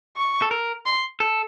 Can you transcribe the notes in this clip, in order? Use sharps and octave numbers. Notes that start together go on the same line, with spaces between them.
C#6
A4
A#4
C6
A4